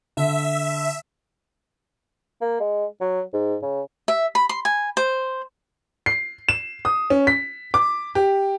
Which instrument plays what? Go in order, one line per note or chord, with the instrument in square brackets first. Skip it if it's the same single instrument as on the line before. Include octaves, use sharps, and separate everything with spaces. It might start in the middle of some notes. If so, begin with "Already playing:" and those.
[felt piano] D3 [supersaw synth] E5
[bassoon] A#3
G#3
F#3
G#2
C#3
[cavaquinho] E5
B5
C6
G#5
C5
[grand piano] C7
E7
D#6
C#4
B6
D6
G4